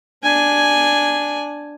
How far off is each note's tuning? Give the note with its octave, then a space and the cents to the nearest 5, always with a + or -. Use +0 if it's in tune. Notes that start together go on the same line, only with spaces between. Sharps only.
D4 +0 G#5 +0